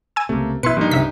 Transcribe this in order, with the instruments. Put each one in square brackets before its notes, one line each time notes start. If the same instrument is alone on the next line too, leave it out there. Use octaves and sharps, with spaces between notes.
[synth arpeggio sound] G#5 E6
[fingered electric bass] C#2 C3 [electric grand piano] A3 A#3
[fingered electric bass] A#1 B2 [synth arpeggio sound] E4 C#7 [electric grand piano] B4 C6
[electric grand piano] G2 D#4 [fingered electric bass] F3 G3 A#3
[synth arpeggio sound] C#2 E5 B6 [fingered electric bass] C3